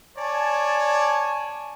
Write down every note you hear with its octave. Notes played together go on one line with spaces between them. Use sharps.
C#5 D5 G#5 A5